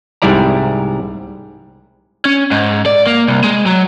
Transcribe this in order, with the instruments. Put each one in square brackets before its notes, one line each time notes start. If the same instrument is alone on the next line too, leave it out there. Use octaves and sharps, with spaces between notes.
[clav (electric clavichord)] C2 G#2 G3 E4 D5 A#5
[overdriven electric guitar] C#4
G#2
D5
A#3
C2
G#3
F#3